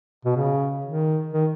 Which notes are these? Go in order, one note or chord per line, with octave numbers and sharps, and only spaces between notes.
B2
C#3
D#3
D#3